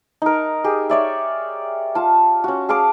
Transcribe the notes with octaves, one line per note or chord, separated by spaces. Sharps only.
D#4 A#4
G4 G#4
C#5 D5 E5
F4 A5
C#4 F#4
G#4 F5 A5 D6